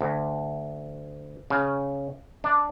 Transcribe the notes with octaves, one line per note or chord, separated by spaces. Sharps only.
D2
C#3
D4